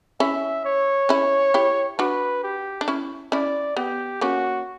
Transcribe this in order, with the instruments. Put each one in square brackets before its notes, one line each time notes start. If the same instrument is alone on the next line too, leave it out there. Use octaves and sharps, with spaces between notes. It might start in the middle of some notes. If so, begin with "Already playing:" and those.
[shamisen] C#4 E4 [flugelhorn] E5
[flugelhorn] C#5
[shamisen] C#4 E4
E4 G4
[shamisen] D4 F#4 [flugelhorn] B4
[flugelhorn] G4
[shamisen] D4
C#4 E4
[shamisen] C#4 E4 [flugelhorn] D5
[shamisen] B3 [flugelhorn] G4
[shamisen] A#3 C#4 [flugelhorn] F#4